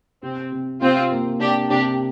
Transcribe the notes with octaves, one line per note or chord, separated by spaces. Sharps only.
C3 C4
C3
C3 C4 F4
A#3
C3 D4 G4
C3 D4 G4